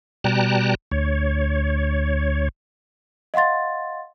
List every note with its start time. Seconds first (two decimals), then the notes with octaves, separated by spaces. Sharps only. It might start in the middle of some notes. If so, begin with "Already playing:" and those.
0.24 B2 G3 G5 A5 A#5 F#6
0.91 D2 C#5
3.34 D#5 F5 F#5 C6 A6